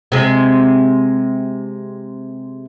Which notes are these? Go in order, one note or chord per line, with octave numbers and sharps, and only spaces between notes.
C3 G#3